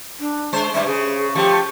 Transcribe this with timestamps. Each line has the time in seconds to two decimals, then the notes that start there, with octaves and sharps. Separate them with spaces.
0.20 D4
0.53 G#3 C5
0.74 G2 G3 E5
0.86 C#3 G#4
1.35 F3 A3 G4